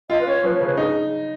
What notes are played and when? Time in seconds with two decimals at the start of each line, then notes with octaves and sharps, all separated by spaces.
0.10 F4 D#5
0.21 B4
0.27 C#4 C#5
0.44 F3 B4
0.54 C#5
0.61 C#3
0.66 B4
0.77 D#4 G#4